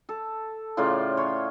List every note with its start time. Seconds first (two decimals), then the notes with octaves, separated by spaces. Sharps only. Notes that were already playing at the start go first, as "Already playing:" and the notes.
0.09 A4
0.77 A2 C#3 F4 D5
1.17 C#5 C6